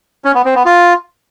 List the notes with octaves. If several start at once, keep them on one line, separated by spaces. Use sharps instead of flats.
C#4
B3
C4
B3
F4